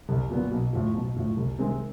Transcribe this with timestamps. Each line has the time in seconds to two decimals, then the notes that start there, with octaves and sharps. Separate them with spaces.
0.09 C2
0.30 A#2 F#3 B3
0.51 B1
0.73 A2 F3
0.94 B1
1.16 A2 F3
1.37 C2
1.59 C3 D#3 G#3 C4